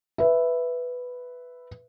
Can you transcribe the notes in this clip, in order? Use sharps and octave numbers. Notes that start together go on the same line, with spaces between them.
B4 E5